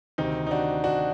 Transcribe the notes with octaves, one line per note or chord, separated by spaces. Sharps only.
D2 C3 D#3 C4 D#4
D#4
D4 F#4
D4 F#4